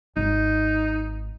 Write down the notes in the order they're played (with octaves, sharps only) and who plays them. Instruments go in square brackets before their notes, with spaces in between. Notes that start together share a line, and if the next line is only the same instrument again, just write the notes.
[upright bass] G#1 [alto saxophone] D#4